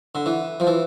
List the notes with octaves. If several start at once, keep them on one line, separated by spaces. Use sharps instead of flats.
D3
E3
F3
E3